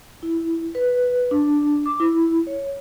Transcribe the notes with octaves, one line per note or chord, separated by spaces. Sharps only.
E4
B4
D4
D6
E4
C#5